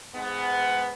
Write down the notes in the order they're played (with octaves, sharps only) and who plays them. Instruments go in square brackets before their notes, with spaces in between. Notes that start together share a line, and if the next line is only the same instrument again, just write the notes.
[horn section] G#2 G#3 B3